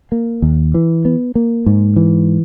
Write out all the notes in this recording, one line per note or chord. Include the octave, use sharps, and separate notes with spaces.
A#3
D#2
E3
B3
A#3
G#2
E3